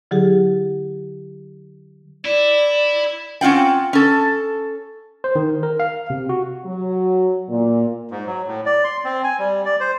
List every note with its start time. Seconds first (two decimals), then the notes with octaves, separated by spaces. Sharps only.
0.11 D3 F#3 E4 G4 G#4
2.25 E4 D5
3.41 C4 C#4 F4 F#5 G5
3.93 C#4 A4
5.24 C5
5.36 D#3
5.63 A#4
5.80 F5
6.10 C3
6.29 F#4
6.66 F#3
7.49 A#2
8.11 G#2
8.26 F#3
8.47 A2
8.66 D5
8.84 C6
9.05 C4
9.24 G#5
9.39 G3
9.65 D5
9.80 C5